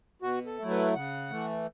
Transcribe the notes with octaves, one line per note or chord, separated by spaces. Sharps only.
B2 F#4
A4
F#3 A3 E4
B4
C#3 F#5
E3 A3